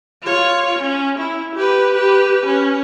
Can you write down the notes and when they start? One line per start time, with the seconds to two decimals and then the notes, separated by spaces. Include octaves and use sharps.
0.22 F4 C#5
0.79 C#4
1.19 E4
1.55 G4 B4
1.94 G4 B4
2.46 C#4